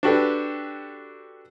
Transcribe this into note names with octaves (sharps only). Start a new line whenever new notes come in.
D4 F#4 G4 A4 B4